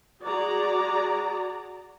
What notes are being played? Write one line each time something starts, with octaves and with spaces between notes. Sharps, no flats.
F#4 G#4 D5 A#5